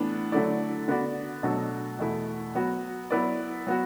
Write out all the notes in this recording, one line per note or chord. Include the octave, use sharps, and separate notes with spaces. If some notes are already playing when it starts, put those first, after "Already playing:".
Already playing: A2 E3 B3 D4
D3 F#3 A3 E4 D5
D3 B3 F#4 D5
B2 F#3 A3 D4 A4
E2 B2 A3 E4
F#3 B3 F#4
F#3 B3 E4 B4 D5
F#3 B3 F#4